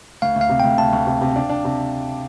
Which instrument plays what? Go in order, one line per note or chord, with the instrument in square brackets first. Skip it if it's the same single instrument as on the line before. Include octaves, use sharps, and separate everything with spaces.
[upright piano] D2 [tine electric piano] F5
[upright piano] D2
[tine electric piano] F5
[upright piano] C3
[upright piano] D2 [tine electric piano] G5
[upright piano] D2 [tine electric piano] A5
[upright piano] D2
C3
C3
D4
D4
C3